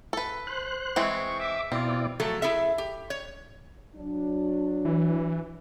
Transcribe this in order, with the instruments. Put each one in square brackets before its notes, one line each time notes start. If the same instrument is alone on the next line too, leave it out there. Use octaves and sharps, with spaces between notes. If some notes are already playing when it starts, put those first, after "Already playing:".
[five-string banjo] A4 B4
[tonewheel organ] C5 F#6
[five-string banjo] E3 G#3 C4 [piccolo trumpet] C#6
[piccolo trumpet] E5 [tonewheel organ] D6
[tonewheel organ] B2 E4 D5 [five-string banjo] C4 [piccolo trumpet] F4
[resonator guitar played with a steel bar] F3 F#3 A3 A4
E4 G#4 A4 E5
G4
C#5
[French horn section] F#3 D4
[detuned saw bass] E3